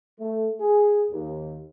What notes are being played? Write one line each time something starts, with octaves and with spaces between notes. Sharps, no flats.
A3
G#4
D#2